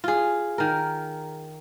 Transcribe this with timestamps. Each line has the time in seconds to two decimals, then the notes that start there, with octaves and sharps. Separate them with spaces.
0.04 F4 G#4
0.58 D#3 A#4